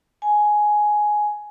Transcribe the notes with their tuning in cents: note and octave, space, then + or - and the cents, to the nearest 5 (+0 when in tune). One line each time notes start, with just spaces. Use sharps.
G#5 +10